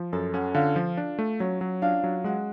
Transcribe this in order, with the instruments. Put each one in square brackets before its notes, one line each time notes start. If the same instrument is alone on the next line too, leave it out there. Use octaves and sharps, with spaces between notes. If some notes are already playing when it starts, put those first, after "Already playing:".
Already playing: [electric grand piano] F3
[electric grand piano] F#2 [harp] A4 A5
[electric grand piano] C#4 [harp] F#4 F#5
[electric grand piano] D3 [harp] F4 F5
[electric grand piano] F3
D4
A3
[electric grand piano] F#3 [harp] C#4 C#5
[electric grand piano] F#3
[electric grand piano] D4 [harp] F4 F5
[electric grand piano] F#3
[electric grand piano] G#3 [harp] F#4 F#5